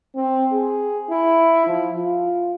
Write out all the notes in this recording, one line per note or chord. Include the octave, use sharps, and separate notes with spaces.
C4
G#4
E4
F3
F4